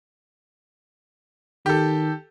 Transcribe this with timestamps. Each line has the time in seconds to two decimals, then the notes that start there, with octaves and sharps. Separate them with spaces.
1.66 D#3 G4 A4